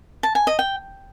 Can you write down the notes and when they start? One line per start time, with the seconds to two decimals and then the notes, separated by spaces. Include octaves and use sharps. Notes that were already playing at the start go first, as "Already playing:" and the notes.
0.23 A5
0.35 G#5
0.47 D#5
0.59 G5